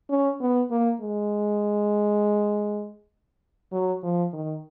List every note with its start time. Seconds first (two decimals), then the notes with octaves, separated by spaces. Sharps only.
0.10 C#4
0.41 B3
0.71 A#3
1.01 G#3
3.72 F#3
4.03 F3
4.33 D#3